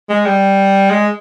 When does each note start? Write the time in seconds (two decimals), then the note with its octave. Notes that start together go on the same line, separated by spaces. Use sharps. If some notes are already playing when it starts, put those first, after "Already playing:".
0.09 G#3
0.26 G3
0.90 G#3